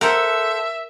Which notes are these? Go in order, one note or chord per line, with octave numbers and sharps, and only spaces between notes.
A4 A#4 C5 E5 F#5